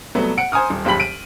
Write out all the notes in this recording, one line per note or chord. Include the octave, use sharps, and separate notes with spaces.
C2 F#3 A3 B3
F#5 C#7 D7
C5 G#5 A#5 D#6 F6
D#1
F#1 D#2 G4 B5 B6 F#7
D7 D#7